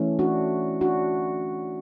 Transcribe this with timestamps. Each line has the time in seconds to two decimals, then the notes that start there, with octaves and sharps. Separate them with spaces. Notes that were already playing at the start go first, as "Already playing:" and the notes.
Already playing: E3 A3 C#4
0.19 D4 F#4
0.81 D4 F#4